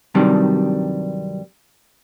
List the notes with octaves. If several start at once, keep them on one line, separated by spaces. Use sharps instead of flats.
G2 C3 D#3 F#3 G3 D4